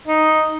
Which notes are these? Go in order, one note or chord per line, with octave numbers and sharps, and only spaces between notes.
D#4